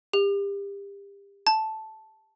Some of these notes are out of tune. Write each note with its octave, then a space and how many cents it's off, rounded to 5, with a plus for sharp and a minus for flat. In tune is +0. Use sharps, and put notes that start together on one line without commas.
G4 +30
A5 -5